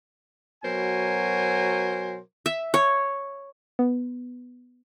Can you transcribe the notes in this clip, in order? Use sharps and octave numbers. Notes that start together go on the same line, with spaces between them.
B2 F#3 A#4 C5 G#5
E5
C#5
B3